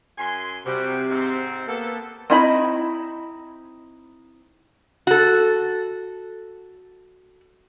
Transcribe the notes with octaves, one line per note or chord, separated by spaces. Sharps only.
F#2 G#5 C6
C3 G3 F#4
G#2 C4
A#3 B3 A4
C4 D#4 E4 D#5 B5
F#4 A4